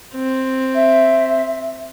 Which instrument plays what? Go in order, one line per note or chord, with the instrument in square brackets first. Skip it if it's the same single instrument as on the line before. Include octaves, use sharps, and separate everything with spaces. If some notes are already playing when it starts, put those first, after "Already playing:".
[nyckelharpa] C4
[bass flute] E5